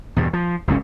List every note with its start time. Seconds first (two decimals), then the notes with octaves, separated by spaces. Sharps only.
0.16 E2 G2 B2
0.33 F3
0.68 F#1 C#2 G#2 C#4